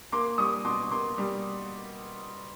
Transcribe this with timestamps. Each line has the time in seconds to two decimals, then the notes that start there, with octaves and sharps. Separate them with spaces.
0.12 A#3 C6 D6
0.38 G3 C#6 D#6
0.65 B2 C6 D6
0.91 A#3 C6 D6
1.18 G3